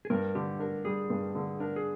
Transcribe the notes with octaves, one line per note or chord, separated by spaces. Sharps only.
G#4
G2 A#4
D3 G4
D4 A#4
G3 G#4
G2
D3
D4 A#4
G#4